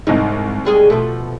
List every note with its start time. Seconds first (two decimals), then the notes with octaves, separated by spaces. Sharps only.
0.07 C2 G#2 D#4
0.65 G3 G#3 G#4
0.90 B2 F3 A3